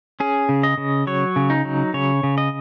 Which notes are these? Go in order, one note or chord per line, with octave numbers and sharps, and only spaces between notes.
C#4 G#4
C#3
D#5
C#3
F#3 C#5
C#3
D#4
F#3
C#3 C#5
C#3
D#5